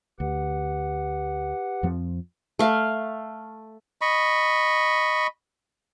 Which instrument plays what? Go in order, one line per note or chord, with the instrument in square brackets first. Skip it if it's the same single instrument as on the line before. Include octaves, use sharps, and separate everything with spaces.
[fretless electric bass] D2 [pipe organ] G4 B4 F#5
[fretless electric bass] F2 F3 C4
[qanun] A3 F5
[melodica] D#5 B5 C#6